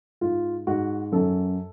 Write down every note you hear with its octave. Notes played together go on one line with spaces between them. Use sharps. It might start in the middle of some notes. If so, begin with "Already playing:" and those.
G#2 F4
G#2 F#4
F#2 A4